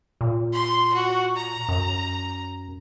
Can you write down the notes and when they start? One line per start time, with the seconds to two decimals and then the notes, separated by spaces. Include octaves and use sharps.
0.21 A#2
0.53 C6
0.94 F#4
1.37 A#5
1.69 F#2